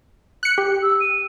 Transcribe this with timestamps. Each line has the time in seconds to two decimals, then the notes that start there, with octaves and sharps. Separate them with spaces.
0.43 F#6 C#7
0.58 G4
0.83 E6
1.00 D#7